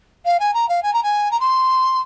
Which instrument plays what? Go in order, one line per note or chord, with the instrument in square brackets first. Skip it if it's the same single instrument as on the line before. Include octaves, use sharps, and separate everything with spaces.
[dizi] F5
G#5
A#5
F5
G#5
A#5
G#5
A#5
C6